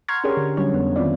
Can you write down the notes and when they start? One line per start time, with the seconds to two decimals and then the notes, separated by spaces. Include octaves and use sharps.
0.08 F#5 A#5 C6 C#6 F6 G#6
0.24 C#4 D4 G4 G#4 A#4 C#5
0.37 D3
0.57 D3 F#3 G3 C#4 D4 C#5
0.73 F2 B3
0.96 D#3 B3 C4 E4 F4 D5